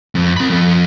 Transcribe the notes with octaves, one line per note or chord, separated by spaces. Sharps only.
F2
C4 B5
F3 A4